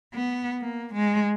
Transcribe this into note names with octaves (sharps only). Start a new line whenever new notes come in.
B3
A#3
G#3